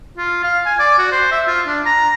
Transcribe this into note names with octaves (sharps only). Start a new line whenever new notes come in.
F4
F5
G#5
D5
F#4
C5
E5
F4
D4
A#5